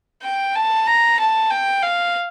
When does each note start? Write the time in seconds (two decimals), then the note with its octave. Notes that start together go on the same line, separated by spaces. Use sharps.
0.23 G5
0.55 A5
0.87 A#5
1.19 A5
1.51 G5
1.83 F5